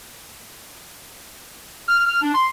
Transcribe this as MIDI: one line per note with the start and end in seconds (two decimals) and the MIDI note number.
1.88 2.03 89
2.06 2.18 89
2.22 2.33 62
2.35 2.48 84